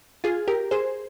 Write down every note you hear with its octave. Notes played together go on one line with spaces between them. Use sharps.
F4 G#4
G4 A#4
G#4 C5